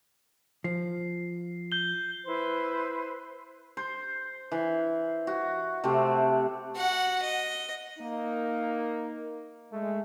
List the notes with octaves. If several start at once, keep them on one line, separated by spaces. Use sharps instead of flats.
F3 C7
G6 G7
E4 B4 C5
C5
E3
F#4
C3 A3 C4 F#4
F#4 F#5
D#5
A#3 D#4
G#3 A3